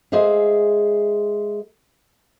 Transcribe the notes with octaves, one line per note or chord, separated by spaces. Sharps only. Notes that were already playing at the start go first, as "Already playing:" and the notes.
G#3 G#4 C5 E5 F5